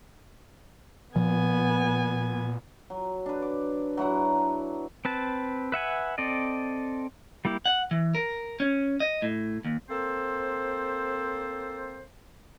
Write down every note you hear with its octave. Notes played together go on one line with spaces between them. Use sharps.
A#2 F3 B3 G#5
F#3
D4 B4
D6
F#3 E4 F#5 A#5
C4 B4 A5
B4 E5 F#5 G#5
C4 A4 D5 D#5
G3 A#3 E4 G4
F#5
E3
A#4
C#4
D#5
A2
D#2
A#3 C4 A4 C5